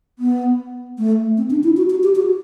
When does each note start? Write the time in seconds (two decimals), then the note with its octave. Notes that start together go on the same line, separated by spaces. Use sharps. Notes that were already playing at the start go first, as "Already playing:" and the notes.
0.19 B3
0.98 A3
1.37 C4
1.50 D4
1.63 E4
1.77 F#4
1.90 F#4
2.03 G4
2.15 F#4